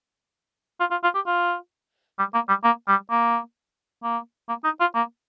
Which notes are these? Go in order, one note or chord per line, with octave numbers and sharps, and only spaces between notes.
F4
F4
F4
G4
F4
G3
A#3
G3
A#3
G3
A#3
A#3
A#3
D#4
F4
A#3